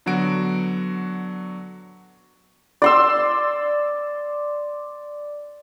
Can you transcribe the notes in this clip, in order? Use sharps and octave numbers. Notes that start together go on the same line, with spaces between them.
D3 F#3 B3 F#4 D7
D5 C6 E6